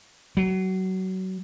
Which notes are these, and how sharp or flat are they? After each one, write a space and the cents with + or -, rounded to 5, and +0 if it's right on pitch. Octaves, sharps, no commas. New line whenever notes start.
F#3 +25